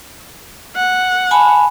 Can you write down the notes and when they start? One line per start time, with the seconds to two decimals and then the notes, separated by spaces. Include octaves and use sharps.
0.76 F#5
1.31 G#5 A5 B5